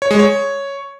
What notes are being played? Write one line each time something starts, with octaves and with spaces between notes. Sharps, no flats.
C#5
G#3
C#5